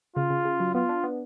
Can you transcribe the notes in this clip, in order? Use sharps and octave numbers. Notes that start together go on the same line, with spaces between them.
C#3 F4
C#3
C#3
F#3
B3 F4
D4
B3